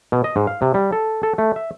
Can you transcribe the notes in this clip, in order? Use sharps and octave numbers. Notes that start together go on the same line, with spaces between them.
B2
D#5
G#2
F5
C3
G3
A4
A4
A3
E5